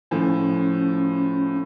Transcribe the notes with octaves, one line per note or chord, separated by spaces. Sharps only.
A2 F3 C#4